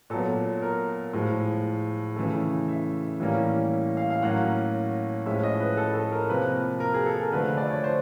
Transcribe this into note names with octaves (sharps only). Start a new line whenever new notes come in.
A#2 F#3 B3 A4
A#4
A2 F3 G#3
C#3 E3 A3
E5
A2 E3 G3 A#3 C#4
F5
F5
A2 F#3 A#3 C#4 F#5
A2 F3 G#3 C#4 E5
D#5
B4
A4
A4
A#4
C3 F3 A#3 B4
A#4
G#4
A4
A#4
D3 F3 A3 B4
D5
C#5
C5